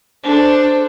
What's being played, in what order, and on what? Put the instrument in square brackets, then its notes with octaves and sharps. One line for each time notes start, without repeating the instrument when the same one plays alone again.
[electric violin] D4 [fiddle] A4 C5